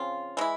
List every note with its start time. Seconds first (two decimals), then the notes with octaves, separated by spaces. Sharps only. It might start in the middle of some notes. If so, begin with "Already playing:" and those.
Already playing: C#3 F3 C4 F4
0.37 E3 G#3 E4